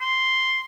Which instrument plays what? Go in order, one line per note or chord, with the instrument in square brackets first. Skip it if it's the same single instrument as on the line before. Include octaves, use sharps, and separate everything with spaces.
[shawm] C6